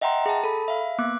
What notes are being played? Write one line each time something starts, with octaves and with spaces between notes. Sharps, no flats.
D#5 E5 F#5 G5 A#5 C6
G#4 A5
A4 B5
E5 F5
A#3 B3 D6 F#6